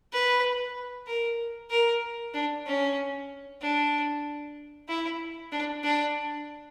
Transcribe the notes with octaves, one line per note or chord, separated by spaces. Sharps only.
B4
A#4
A#4
D4
C#4
D4
E4
D4
D4